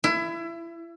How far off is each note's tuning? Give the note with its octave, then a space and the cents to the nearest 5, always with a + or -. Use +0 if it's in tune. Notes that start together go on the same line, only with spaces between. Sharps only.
E4 +25